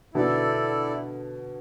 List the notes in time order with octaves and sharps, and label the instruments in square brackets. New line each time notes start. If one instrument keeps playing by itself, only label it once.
[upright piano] B2 D3 [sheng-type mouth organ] E4 A4 D5